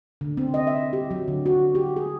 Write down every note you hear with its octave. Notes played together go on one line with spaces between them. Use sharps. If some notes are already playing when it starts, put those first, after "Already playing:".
D3
C4
D#5
E5
G4
F#3
D3
F#4
G4
G#4